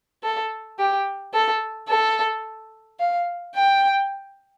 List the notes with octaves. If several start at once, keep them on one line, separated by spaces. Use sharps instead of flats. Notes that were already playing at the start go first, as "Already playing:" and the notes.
A4
G4
A4
A4
F5
G5